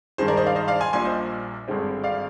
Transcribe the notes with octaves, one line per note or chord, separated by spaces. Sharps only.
G2 D#3 G#3 G#4 C5
A#4 D5
C5 D#5
D5 F5
C5 D#5
D5 F5
G#5 C6
A#1 A#2 G3 G#5 C6
C5 D#5
G#1 G2 D3 G#3 C4
D5 F5